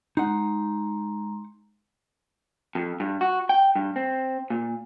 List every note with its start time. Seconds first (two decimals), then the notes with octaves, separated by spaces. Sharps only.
0.17 G#3 D#4 F#5 A#5 C6
2.75 F2
3.00 G2
3.21 F#4
3.49 G5
3.76 G2
3.96 C4
4.50 A#2